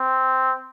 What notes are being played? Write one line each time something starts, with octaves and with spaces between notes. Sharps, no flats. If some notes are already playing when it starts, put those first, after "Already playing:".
Already playing: C4